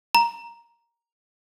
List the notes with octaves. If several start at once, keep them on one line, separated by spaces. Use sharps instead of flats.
A#5